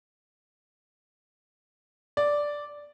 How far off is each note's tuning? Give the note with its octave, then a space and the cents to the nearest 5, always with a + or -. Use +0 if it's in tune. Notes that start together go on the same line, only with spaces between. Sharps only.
D5 -5